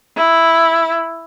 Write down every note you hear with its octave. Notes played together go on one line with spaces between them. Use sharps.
E4